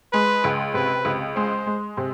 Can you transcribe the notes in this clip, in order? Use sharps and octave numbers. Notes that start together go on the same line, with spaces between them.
G#3 B4
C#2
C3 B4
C#2
G#3 C5
G#3
C3